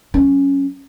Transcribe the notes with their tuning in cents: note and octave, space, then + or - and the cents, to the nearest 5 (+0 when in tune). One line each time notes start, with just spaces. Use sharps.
F#3 +0 C#4 +0